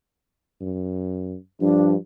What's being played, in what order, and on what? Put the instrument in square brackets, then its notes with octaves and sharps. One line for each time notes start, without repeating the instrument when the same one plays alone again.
[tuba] F#2
[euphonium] G2 [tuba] F3 [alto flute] D4